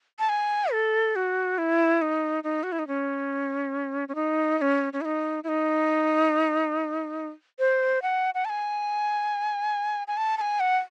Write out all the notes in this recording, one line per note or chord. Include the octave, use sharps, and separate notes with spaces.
A5
G#5
A4
F#4
E4
D#4
D#4
F#4
E4
D#4
C#4
C#4
D#4
D#4
C#4
C#4
E4
D#4
E4
D#4
C5
F#5
F#5
A5
G#5
G#5
A5
A5
G#5
F#5